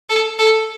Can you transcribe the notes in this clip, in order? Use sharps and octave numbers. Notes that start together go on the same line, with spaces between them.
A4
A4